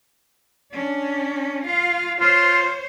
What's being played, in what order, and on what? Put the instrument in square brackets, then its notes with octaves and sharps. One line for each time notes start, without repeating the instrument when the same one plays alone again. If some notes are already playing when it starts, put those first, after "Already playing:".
[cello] C#4 D4
F4 F5
[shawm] F4 [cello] C5 C#5